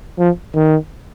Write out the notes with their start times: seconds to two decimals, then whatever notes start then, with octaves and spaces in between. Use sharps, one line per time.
0.19 F3
0.55 D#3